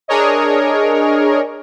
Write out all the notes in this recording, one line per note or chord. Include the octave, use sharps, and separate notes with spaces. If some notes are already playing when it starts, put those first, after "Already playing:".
D4 G#4 A#4 C#5 D#5